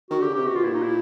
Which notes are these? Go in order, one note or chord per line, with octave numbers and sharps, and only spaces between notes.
D#3 F#4
D3 G4
C#3
C3 G4
B2 F#4
F4
A#2 E4
D#4
E4